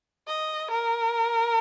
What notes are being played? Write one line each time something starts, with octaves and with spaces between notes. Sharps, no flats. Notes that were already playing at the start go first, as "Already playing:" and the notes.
D#5
A#4